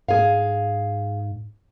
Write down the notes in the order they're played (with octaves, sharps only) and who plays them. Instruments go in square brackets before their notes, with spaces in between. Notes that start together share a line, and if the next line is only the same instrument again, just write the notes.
[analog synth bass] G#2 [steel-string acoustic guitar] G#4 F5